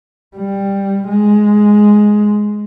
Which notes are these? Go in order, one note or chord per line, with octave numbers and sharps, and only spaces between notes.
G3
G#3